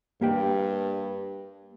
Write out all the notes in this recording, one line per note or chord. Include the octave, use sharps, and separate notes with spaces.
G2 A#3 G4 G5